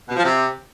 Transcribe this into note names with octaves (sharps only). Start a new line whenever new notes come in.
B2
F3
C3